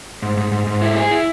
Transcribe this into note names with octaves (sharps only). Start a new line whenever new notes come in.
G#2
G#2
G#2
G#2
E4
G#4
E4